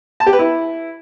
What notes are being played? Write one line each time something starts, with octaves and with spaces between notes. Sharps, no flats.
A5
G4
B4
E4